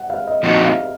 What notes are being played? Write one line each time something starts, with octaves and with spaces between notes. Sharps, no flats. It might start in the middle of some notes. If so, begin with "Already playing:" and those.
Already playing: F#5
F5
D#5
A#2 F3 C4 D#4 F#4 D#5
F5